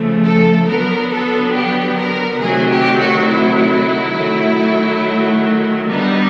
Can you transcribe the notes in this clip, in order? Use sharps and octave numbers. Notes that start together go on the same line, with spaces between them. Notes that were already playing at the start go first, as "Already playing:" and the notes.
Already playing: C#3 F3 A3
A4
D3 F#3 B3 A#4
A4
G4
A#4
C3 D#3 F#3 A3 G#4
G4
F#4
E4
D#3 F#3 A3
D3 G3 B3 D#4